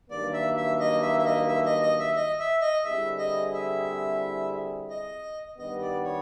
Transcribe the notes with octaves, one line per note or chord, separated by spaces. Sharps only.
G2 D#3 F#3 A#3 D5
E5
E5
D#5
E5
E5
D#5
E5
D#5
D#5
E5
D#5
E5
D#5
D3 G3 C4 E4 G#4 E5
D#5
E5
D#5
G2 D#3 G3 B3 D#5
D5
C#5